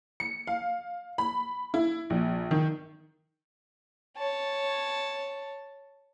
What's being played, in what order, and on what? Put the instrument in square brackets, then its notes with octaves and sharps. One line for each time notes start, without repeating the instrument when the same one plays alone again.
[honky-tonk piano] C#7
F5
B5
E4
A#1
D#3
[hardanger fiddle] C#5 A5